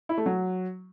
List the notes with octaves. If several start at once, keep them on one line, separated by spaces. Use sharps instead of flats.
E4
A3
F#3